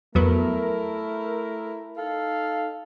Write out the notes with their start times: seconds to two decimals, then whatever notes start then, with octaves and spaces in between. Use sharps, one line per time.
0.15 F2 F#3 A3 B3 E4 A#4
1.97 D#4 A4 F5